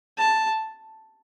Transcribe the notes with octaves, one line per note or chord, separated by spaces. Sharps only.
A5